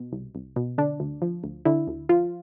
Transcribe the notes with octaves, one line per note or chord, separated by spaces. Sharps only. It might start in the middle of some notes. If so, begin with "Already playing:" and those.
Already playing: B2
C2
C2
B2
D3 D4
D2
F3
D2
D3 E4
D2
F3 F4